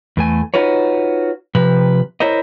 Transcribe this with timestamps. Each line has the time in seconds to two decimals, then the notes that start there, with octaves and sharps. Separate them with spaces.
0.17 E2 A3 G#5
0.54 D#4 F4 F#4 B4 C#5
1.55 C3 F3 B4
2.20 E4 A#4 C5 C#5 D#5